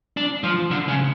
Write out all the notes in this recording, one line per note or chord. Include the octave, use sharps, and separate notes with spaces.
D4
F3
D3
C#3